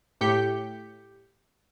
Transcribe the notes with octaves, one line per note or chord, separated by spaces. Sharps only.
A2 G4 G6 B6 C#7